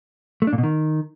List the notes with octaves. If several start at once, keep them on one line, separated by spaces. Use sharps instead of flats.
A3
D4
A#2
B2
D#3